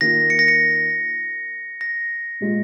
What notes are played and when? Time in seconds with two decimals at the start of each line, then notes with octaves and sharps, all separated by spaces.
0.01 D#3 A#3 F4 A#6
0.30 C#7
0.39 A#6
0.48 C#7
1.81 A#6
2.40 A#2 G#3 F4